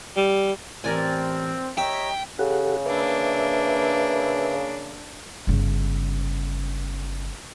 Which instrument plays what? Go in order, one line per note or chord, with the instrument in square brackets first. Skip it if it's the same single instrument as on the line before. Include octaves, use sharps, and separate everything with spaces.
[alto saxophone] G3
[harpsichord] A1 [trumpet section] C4 [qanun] A#4 D5 G#5
[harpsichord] G4 [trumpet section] C#5 D#5 A#5 [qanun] E5 [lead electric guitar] G5
[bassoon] C#3 [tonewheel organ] G4 A4 F#5
[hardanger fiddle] A#3 D4 [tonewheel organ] B4 E5
[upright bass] G1 C#3